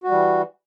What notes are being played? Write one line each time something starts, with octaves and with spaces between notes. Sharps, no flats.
E3 G3 F#4